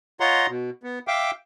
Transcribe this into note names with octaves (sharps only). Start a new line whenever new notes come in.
F4 C#5 D#5 F#5 A#5 C6
B2
B3
E5 F5 G5 D6